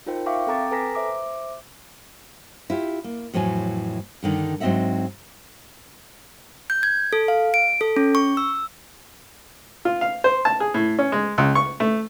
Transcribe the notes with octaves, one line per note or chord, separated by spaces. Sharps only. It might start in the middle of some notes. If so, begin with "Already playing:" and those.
D#4 F4 A#4 C5 G5
E5 F5 G5 C#6 D6
C4 A4 G5 A#5 D6 A6
A4 B4 G#5 A#5 A#6 B6
C5 E5 D6
E4 F4 G4
A#3
F2 A2 E3 F#3 G#5
G2 D3 D#3
G#2 F#3 C4 D#5 E5 F#5
G6
G#6
A4
F5
D7
A4
C#4
C#6
E6
F4
F5
C5
A5
G#4
A2
C#4
G#3
C#2
C#6
A3